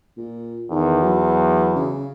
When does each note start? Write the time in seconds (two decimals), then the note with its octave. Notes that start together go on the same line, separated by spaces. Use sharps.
0.17 A#2
0.71 E2 D#3
1.02 F#3
1.75 C#3